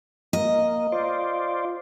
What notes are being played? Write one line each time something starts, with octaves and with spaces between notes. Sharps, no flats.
A#3 D#5
F4 C5 D5